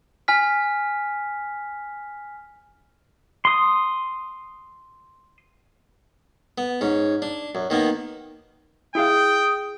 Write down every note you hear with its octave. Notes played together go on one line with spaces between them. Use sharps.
G#5 F6 B6
C6 D#6
B3
G#2 C#4
D4
F#2
D#3 A#3 B3
E4 G#4 F5 G5 D#6